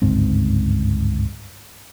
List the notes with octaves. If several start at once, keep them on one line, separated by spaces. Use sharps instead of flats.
G1 C#2 G#2 C4